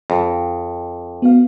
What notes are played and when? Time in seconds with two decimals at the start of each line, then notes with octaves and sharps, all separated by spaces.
0.10 F2
1.22 B3 F#4 F5